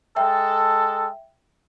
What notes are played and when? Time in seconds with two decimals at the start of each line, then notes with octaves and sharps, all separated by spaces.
0.16 G#3 A4 E5 G5